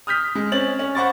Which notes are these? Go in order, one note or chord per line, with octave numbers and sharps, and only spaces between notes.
D#6 F6 G6 B6
G#3
C4 C#4 A6 F#7
C#4
C5 F#5 B5 C#6 D6 A6